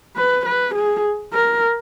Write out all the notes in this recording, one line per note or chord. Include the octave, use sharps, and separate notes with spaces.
B4
B4
G#4
A#4